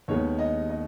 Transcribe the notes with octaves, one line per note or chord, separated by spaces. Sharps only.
D#2 D#3 G#3 B3 C#5
D#5
D#5